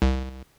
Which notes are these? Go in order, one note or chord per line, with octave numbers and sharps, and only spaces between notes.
C2